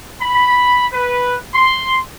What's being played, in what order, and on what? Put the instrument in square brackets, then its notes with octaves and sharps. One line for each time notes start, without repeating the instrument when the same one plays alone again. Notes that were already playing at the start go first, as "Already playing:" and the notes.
[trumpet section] B5
B4
C6